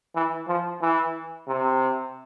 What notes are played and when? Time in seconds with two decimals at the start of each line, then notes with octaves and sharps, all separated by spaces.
0.16 E3
0.48 F3
0.82 E3
1.48 C3